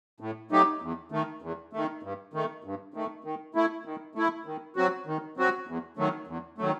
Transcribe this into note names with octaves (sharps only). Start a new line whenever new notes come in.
A2
F#3 A3 D#4 G4
E2
D#3 A3
E2
D#3 A3
G2
D#3 A3
G2
D#3 A3
D#3
A3 E4
D#3
A3 E4
D#3
F#3 C4 F#4
D#3
F#3 C4 F#4
E2
D#3 F#3 A3
E2
D#3 F#3 A3